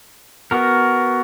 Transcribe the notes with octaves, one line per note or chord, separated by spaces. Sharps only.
B3 F#4 A#4